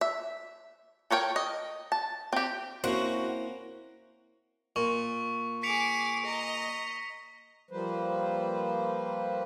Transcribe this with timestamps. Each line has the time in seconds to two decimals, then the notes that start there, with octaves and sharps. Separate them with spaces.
0.01 E5
1.11 A4 A#4 C#5 G5
1.36 D#5
1.92 A5
2.33 C4 G4
2.84 A#3 C4 C#4 E4 F#4 C5
4.76 A#2 C#6
5.63 G#4 D6 B6 C#7 F7
6.25 D#5 A#5
7.71 F3 G3 A#3 B4 C5